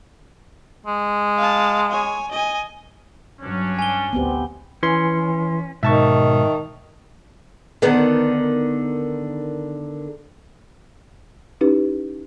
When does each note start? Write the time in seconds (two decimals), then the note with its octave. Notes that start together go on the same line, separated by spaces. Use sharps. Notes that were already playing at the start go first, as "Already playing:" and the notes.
0.86 G#3
1.37 F5 A5
1.91 C#5 G#5
2.31 D#5 G#5
3.40 G2 F#3 C#4 D4
3.79 G#5 G7
4.13 A1 D2 B3 C4 G4
4.83 E3 C#4 C6
5.83 G#2 B2 D#3 E5 A5 C#6
7.82 D3 D#3 B3
11.61 C#4 D#4 E4 G4 B4